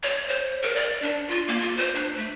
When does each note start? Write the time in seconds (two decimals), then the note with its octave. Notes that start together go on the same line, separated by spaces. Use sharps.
0.03 C#5
0.29 C5
0.63 A#4
0.76 D5
1.02 D4
1.28 F4
1.48 A#3
1.60 F4
1.77 C5
1.95 D4
2.17 A3